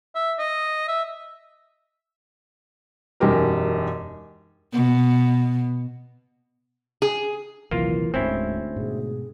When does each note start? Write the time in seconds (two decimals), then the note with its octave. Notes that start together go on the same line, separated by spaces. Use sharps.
0.15 E5
0.39 D#5
0.88 E5
3.20 E1 F#2 D#4 G4 A#4
4.73 B2
7.02 G#4
7.71 A#1 D#2 C3 E3 F#3 A#3 F4
8.14 D1 D2 G#2 G#3 C4 C#4 E4
8.76 G#2 B2 G#4